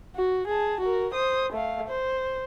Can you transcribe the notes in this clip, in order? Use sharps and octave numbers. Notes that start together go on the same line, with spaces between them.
F#4
G#4 A5
F#4 A#4
C5 D#6
A3 F5
C5